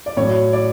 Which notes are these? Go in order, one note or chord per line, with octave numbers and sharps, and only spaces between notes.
D5
A2 F#3 C#5
D5